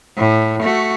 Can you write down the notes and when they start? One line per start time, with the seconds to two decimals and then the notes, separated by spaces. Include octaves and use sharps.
0.18 A2
0.62 A3 F#4